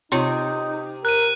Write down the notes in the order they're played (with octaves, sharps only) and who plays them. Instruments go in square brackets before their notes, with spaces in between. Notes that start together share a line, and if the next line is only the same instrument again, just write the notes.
[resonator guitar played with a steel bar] C3 [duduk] D#4 [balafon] F4 C#5 C6
[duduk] A#4 [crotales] F#6 D#7